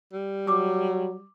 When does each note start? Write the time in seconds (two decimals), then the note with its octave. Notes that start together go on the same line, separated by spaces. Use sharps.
0.13 G3
0.47 F#3 D6 E6